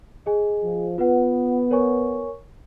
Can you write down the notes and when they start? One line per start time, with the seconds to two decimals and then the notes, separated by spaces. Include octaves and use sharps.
0.26 G#4 D#5 G#5
0.63 F3
0.98 B3 F4 B4 F#5
1.71 A#4 C#5 G#5 C#6